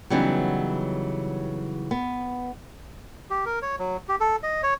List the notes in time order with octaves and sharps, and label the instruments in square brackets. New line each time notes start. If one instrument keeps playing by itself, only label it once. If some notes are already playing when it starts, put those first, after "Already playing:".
[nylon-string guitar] C#3 E3 F#3 G3 B3 D#4
B3
[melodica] G4
A#4
C#5
F#3
G4
A4
D#5
C#5